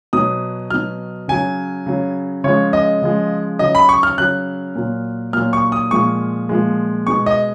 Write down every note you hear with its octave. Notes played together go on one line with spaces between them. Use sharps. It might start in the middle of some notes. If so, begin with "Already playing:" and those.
B2 F#3 D#6
B2 F#3 F6
C#3 F#3 G#5
C#3 F#3
C#3 F3 G#3 C#5
D#5
C#3 F3 G#3
C#3 F#3 D#5
B5
C#6
F6
C#3 F#3 F#6
A#2 F#3
A#2 F#3 F6
C#6
D#6
A#2 F3 G#3 C#6
A#2 F3 G#3
B2 G#3 C#6
D#5